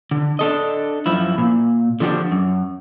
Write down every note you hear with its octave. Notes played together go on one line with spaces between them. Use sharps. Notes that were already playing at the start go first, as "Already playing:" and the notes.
D3
D4 A4 D#5
F#2 F3 E4
A#2
D3 F3 D4 F#4 G4
F#2